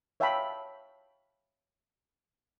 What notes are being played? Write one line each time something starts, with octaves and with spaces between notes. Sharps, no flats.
C#5 E5 F5 G5 A5 B5